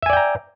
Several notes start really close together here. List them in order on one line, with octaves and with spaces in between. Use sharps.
E5 G#5 D5 G5 A#5